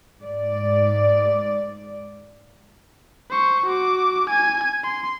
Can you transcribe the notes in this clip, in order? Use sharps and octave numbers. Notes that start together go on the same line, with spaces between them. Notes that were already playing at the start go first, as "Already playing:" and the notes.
G#2 D5
C5 C#6
F#4 D6
G#5 G#6
C6